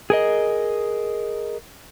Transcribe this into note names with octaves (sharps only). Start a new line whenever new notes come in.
G#4 A#4 D#5